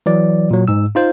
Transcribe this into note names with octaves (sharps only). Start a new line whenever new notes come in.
E3 F#3 D5
A#2 F#3
G#2 E6
D#4 F4 C5